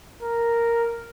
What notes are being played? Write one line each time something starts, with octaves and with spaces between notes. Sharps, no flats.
A#4